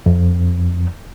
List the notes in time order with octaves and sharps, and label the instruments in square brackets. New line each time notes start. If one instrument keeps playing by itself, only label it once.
[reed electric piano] F2